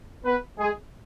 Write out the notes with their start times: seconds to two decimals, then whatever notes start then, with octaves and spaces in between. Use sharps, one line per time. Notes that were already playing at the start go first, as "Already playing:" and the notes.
0.25 B3 B4
0.58 G#3 G#4